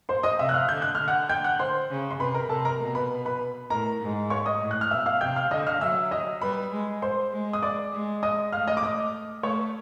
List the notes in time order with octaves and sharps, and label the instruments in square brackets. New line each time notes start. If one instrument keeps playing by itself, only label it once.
[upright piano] C5 C6
D#5 D#6
[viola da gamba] C3 [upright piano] E5 E6
[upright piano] F#6
F5 F6
[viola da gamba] D3 [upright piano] G6
[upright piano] F#6
[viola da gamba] D3 [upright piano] F6
[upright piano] F#5 F#6
G5 G6
F#5 F#6
C5 C6
[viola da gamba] C#3
[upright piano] C6
[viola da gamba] C3 [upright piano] B4 B5
[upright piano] A#4 A#5
[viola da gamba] C3 [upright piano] A4 A5
[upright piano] A#4 A#5
[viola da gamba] B2
[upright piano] B4 B5
B4 B5
[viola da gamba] A2 [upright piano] A#4 A#5
[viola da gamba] G#2
[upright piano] C#5 C#6
D#5 D#6
[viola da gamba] A2
[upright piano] F#6
F6
[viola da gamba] B2 [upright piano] E5 E6
[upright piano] F5 F6
[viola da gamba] C3 [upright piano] G5 G6
[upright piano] F5 F6
[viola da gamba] D3 [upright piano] D#5 D#6
[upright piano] F5 F6
[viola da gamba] F#3 [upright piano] E5 E6
[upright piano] D#5 D#6
[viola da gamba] G3 [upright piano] B4 B5
[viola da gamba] G#3
[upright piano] C5 C6
[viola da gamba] G#3
[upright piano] D#6
D5 D6
[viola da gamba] G#3
[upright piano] D#5 D#6
[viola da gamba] A3 [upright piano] F5 F6
[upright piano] D#5 D#6
D6
D#5 D#6
[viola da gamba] A3 [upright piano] C#5 C#6